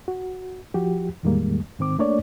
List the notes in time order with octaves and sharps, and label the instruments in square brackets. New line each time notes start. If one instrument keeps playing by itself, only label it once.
[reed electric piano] F#4
F3 F#4 G4
E2 A2 D#3 G3 G#3 A#3
G#2 D#3 C4 D6
A3 A#3 D4 C#5 D5